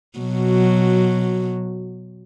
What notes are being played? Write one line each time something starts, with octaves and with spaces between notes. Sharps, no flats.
B2 F#3